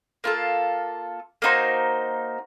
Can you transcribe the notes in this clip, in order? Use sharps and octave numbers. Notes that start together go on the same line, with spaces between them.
A#3 F4 A4
A#3 D#4 F#4 C5